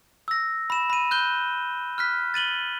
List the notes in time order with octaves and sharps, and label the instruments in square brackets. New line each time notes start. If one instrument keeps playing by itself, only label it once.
[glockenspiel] E6 A#6
B5 E7
B5 D#7
F#6 G6 G7
F6 F#6 B6
A6 D#7 F#7 G7